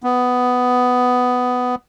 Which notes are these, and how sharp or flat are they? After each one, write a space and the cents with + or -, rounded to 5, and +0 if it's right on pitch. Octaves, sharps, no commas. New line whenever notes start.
B3 +10